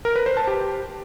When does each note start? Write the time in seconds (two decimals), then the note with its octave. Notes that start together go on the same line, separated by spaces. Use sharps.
0.05 A#4
0.16 B4
0.26 C5
0.37 A5
0.47 G4